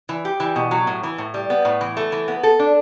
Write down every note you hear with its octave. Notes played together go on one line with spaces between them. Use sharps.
E3
G4
E3
B2
F#3
A2
E3
A2
G3
B3
A2
E3
A3
E3
B3
A4
D4